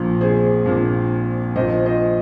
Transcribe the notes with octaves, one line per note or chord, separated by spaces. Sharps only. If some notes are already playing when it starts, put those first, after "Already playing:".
Already playing: A#1 A#2 F3
G#4 C5
A#1 A#2 F3
A#1 A#2 F3 C5 D#5
C5 D#5